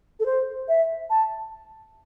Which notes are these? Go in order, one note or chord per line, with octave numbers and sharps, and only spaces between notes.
A4
C5
E5
A5